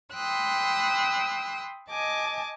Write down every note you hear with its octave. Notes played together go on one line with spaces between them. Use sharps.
G5 B5 C6 D#6 E6 F#6
D#5 G#5 A5 D6